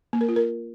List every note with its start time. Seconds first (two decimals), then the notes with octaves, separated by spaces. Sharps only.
0.13 A#3
0.21 A#4
0.29 F4
0.36 A#4